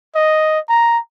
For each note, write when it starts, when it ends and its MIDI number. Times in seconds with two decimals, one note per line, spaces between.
0.16 0.60 75
0.69 0.98 82